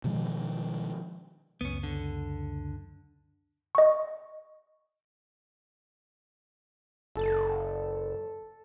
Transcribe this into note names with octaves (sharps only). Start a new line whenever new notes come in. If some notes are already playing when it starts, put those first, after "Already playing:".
B2 D#3 F3 G#3
C#2 F#2 B3 C#4
D3
D#5 C#6
F#1 A4 E6